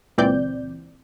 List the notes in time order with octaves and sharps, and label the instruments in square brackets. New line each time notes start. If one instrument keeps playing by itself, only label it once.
[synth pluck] C#2 A#2 E3 C4 D5 G6